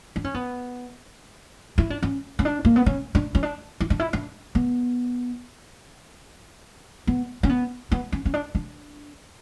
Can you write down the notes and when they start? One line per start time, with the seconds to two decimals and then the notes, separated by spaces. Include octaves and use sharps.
0.16 D4
0.24 C#4
0.34 B3
1.78 E4
1.90 D4
2.03 C#4
2.39 C#4
2.45 D4
2.65 A#3
2.76 B3
2.86 C#4
3.15 D4
3.35 C#4
3.43 D4
3.80 E4
3.90 D4
4.00 E4
4.13 D4
4.55 B3
7.07 B3
7.43 C#4
7.49 B3
7.92 B3
8.12 C#4
8.25 C#4
8.34 D4
8.55 D4